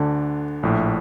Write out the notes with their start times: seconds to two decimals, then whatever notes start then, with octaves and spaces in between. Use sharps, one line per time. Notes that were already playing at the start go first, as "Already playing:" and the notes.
Already playing: D2 D3 D4
0.63 A#1 A2